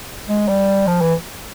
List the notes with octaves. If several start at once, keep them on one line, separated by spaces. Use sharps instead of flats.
G#3
G3
F3
E3